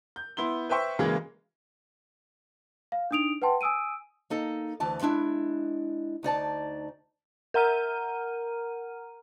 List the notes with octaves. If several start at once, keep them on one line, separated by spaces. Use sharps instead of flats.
G6
B3 E4 C6 G7
B4 C5 E5 G5 C#6
C#3 E3 F#3 G#3 A#3
F5
D4 D#4 D#6 D7 F7
B4 F#5 G5 A5 C6
G#5 D#6 E6 D7 D#7
A#3 D#4 A4
D2 E3 A5
G#3 D4 E4
D2 D#4 D5 A5
A#4 F#5 A#5 F6 D#7